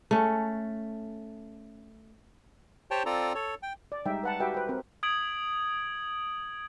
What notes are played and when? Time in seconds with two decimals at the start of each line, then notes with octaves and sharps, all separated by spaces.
0.11 A3 C#4
2.91 G4 C5 C#5 G5 A5
3.06 C4 F4 A4 D5 A#5
3.35 A4 C#5
3.63 G5
3.92 D5
4.06 G3 G#3 D#4 E5 G5
4.23 B4 F#5 A5
4.40 F#4 G4 B4 E5 G5
4.54 B4 C5 G5
4.67 C4 A#4
5.03 D#6 G#6 D7 F#7